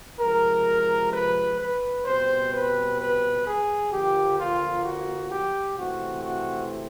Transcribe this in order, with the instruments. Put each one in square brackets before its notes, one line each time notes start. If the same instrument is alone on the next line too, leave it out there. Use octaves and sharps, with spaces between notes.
[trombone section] C3 F3 G#3 A#4
B4
B4
B2 G3 C4 C5
B4
B4
G#4
D3 F3 A#3 G4
F4
F#4
G4
C3 E3 A3 C4 F#4
F#4